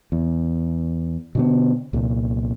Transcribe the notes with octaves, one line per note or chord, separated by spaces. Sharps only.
E2
B2 D3 B3
C2 A#2